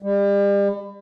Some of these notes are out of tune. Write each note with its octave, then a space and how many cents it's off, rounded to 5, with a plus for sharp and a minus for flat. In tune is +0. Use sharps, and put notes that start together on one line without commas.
G3 +35